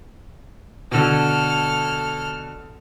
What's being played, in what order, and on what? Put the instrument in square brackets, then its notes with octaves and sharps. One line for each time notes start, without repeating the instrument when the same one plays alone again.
[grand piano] B2 D3 [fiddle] A4 F6